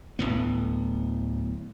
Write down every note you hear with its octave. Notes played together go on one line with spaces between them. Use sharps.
D1 G1 A2 B3